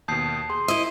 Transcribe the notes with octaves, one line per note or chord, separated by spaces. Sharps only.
D#2 B2 A5 D#6 G6 C7
G#4 C6
E4 D#5 E5 E6